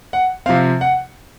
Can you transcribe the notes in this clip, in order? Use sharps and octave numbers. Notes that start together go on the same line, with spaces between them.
F#5
C3 F3 C4 F5
F#5